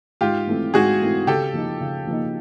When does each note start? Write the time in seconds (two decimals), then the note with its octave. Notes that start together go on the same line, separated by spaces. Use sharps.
0.21 G#2 F4 G4
0.47 E3 A3 C4
0.74 G#2 F#4 G#4
1.01 E3 A3 C4
1.27 C#3 G4 A4
1.54 F3 A#3 D#4
1.80 C#3
2.07 F3 A#3 D#4